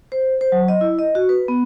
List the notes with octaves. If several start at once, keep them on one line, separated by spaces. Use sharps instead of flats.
C5
C5
F#3
D#5
E4
D#5
F#4
B4
B3